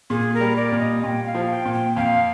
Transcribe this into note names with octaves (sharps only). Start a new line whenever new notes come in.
A#2 G#4
A#4
G3
D5
A#2
D#5
A#2 G5 G#5
F5
F3
G5
A#2
G5
F2 F5